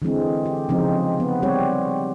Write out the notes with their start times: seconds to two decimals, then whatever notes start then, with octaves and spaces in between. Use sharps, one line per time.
0.02 D3 E3 G#3 C4
0.46 G4
0.69 C#3 F3 G#3 C4 D#4
1.20 B3
1.43 G3 C4 G4 C#5